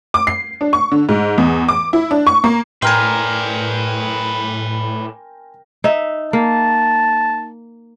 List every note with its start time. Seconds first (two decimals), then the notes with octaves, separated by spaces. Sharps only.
0.14 D6
0.27 C7
0.61 D4
0.73 C#6
0.92 D3
1.09 G#2
1.38 E2
1.68 D6
1.93 E4
2.11 D4
2.27 C#6
2.44 A#3
2.82 A2 A#4 B4 D5 G5 G#5 C6
5.84 D#4 E5
6.33 A#3 A5